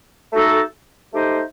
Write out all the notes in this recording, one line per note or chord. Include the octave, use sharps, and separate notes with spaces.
A3 D#4 F#4 A4
A3 D#4 G4 C5 D#5